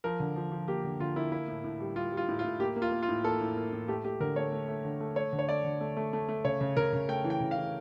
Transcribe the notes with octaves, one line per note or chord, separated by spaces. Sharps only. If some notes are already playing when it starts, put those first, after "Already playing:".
F3 A#4
D3
F3
F3
A#3 G4
D3
D3 F4
A#3 E4
A#3 E4
A2
A2
G3
G3 F4
G3
F4
A2
F4
A2
A#3 G4
A#3
F4
A#3
F4
A2
A#3 A4
A2
A#3
A2
A3 G4
A3 G4
D3 A#4
A3 C#5
A3
A3
D3
A3
A3 C#5
D3
C#5
A3 D5
D3
A3
A3
A3
A3
C#3 C#5
C#3
C#3 A#4
C#3
A3 G5
E3
G5
C#3
F5
E3